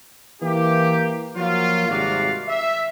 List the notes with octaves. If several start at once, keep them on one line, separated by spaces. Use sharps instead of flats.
E3 A#3 E4 G4
F3 F#3 A#3 F4
G#1 C3 G3 F#4 D5 F5
E5